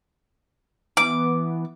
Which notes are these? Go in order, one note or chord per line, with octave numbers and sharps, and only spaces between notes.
E3 B3 D6